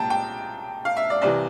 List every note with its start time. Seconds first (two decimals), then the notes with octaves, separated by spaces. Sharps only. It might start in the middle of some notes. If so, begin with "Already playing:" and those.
Already playing: C2 A#2 G5 A5 A#5
0.10 G5
0.85 F5
0.97 E5
1.10 D5
1.22 C2 C3 E3 D5